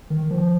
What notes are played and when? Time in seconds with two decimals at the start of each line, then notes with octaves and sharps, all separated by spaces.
0.10 D#3
0.30 F3